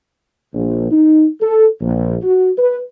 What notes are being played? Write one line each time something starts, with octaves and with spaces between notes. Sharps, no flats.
A#1
D#4
A4
A#1
F#4
B4